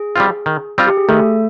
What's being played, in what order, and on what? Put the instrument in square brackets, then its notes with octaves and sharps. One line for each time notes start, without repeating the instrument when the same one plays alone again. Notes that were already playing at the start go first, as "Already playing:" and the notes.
Already playing: [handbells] G#4
[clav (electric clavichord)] G3 C4 F4
D#3
G3 C4 F4
[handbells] G4
G#4
[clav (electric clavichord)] D#3 [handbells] A3 A4